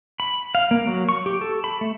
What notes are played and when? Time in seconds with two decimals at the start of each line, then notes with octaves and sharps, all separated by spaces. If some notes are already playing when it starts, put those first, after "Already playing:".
0.20 B5
0.55 F5
0.71 A#3
0.87 F#3
1.09 C#6
1.26 G4
1.41 A4
1.64 B5
1.81 A3